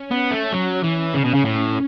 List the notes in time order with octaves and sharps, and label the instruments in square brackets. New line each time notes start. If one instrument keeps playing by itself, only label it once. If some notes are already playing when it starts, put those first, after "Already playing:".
Already playing: [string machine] C#4
[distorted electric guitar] B3
A3
F#3
E3
[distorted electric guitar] C#3 [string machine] C#4
[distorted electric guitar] B2
C#3
[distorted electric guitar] A2 [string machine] C#4